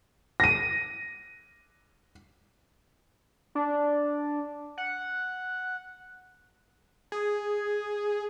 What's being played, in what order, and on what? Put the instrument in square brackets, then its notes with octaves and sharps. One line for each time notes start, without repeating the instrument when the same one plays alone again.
[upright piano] A#6 D#7
[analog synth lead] D4
F#5
[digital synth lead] G#4